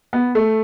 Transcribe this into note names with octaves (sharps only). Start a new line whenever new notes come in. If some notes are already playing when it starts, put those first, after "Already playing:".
B3
A3